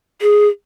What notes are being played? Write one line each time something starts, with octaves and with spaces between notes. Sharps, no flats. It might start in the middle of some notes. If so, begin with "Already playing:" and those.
G#4